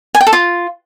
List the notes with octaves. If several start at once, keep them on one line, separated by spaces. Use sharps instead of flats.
G#5
G5
A4
F4